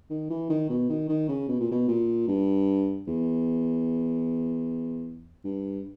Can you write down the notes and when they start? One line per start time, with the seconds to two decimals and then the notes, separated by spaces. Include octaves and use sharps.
0.10 D#3
0.30 E3
0.50 D#3
0.70 B2
0.90 D#3
1.09 D#3
1.29 C#3
1.49 B2
1.60 A#2
1.71 B2
1.88 A#2
2.28 G2
3.07 E2
5.45 G2